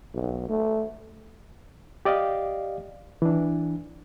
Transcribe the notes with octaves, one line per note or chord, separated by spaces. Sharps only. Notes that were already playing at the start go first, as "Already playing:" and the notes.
B1
A3
G4 D5 D#5 F5
E3 D4